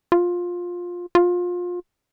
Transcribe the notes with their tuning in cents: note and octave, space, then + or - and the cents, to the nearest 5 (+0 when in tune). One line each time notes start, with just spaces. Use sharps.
F4 +15
F4 +25